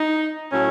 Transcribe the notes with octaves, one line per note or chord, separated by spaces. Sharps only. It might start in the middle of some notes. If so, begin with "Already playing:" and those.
Already playing: D#4
A2 F#3 A3 C#4